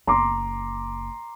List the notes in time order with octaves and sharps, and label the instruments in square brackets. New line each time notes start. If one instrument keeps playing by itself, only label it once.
[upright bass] F#1 [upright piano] A#5 C6 D6